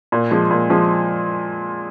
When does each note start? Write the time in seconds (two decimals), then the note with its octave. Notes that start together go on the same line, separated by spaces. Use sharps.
0.12 A#2
0.31 F3 G#3
0.51 A#2
0.70 F3 G#3